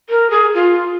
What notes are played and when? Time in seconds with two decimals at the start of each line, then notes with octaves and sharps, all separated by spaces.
0.10 A#4
0.30 G#4
0.54 F4